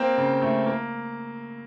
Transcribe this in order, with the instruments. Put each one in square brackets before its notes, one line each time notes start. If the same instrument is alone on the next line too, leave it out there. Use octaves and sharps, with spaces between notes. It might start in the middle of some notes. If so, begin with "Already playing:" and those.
Already playing: [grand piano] A#3 C4
C#3
A3
A#3